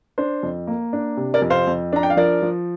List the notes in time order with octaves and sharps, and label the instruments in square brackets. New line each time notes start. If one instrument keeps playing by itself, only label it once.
[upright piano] D4 C5
F2
A#3
D4
C3
A#4 D5
F2
C5 F5
F2
D4 A#5
G5
F5
F3 A#4 D5
F3